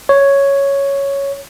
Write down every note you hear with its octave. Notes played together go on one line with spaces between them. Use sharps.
C#5